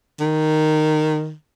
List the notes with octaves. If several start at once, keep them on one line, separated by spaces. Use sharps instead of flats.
D#3